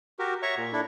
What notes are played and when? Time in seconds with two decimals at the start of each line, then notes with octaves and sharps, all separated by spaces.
0.19 F#4 G4 A#4
0.42 C#5 E5 A#5 C#6
0.57 A#2
0.73 D4 E4 A4